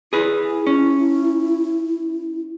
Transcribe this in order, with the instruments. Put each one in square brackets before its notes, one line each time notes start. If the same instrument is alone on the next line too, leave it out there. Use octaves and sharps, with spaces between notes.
[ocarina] E4 [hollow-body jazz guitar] G#4 B4
[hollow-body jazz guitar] C#4